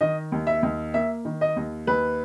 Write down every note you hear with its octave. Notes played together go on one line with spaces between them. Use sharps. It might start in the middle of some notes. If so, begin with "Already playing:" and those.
D#3 D#5
D#2
E5
D#2
A#3 E5
D#3
D#5
D#2
D#2 B4